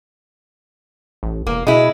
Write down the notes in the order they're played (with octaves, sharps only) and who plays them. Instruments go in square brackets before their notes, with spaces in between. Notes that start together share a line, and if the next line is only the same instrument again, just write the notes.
[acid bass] A1
[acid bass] E1 [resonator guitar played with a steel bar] A#3
[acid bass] B2 [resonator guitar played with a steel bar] G#3 E4